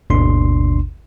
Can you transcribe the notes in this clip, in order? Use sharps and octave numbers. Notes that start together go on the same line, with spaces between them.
G#1 D#2 B2 D4 C6